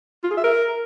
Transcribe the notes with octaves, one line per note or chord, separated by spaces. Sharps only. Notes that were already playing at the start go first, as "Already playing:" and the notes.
F4
G#4
E5
A#4